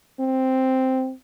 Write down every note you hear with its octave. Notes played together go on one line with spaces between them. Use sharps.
C4